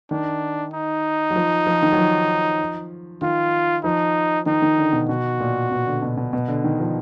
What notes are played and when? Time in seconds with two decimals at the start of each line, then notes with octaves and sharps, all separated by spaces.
0.11 D#3 D4
0.74 D#4
1.30 F#3
1.36 F3
1.67 F3
1.82 D#3
1.92 F#3
1.98 F3
3.22 D#3 F4
3.84 F3 D#4
4.46 D#3 D#4
4.62 D#3
4.78 D3
4.93 B2
5.09 B2 F#4
5.40 A#2
5.71 B2
5.86 D3
6.02 B2
6.17 B2
6.33 B2
6.48 D3
6.64 D#3
6.80 F3